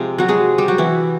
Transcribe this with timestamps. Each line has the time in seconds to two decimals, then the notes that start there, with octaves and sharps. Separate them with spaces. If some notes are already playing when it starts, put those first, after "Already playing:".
Already playing: C3 F3 G#3
0.18 F#3 F#4
0.28 G#3 G#4
0.58 G3 G4
0.68 F#3 F#4
0.78 E3 E4